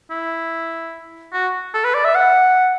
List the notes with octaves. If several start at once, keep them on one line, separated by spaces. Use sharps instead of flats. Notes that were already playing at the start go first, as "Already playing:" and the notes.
E4
F#4
A4
B4
D5
E5
F#5